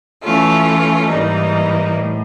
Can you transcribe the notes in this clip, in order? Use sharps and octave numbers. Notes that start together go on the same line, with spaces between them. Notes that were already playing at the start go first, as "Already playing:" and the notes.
E3 A3 C#4 F4
G#2 E3 G3 A#3 D#4
A2